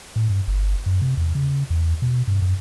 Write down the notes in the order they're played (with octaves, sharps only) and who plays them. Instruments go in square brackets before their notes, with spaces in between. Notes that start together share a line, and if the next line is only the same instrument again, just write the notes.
[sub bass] A2
G2
G1
F#2
C3
E2
C#3
E2
B2
G2
F#2